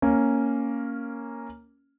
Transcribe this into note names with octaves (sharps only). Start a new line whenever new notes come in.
A#3 C#4